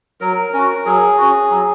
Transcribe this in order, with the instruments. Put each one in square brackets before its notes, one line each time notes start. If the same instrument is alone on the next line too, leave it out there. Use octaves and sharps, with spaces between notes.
[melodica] F#3 A#4
C#4 F#4 A#4
F#3 G#4
C#4 F#4
F#3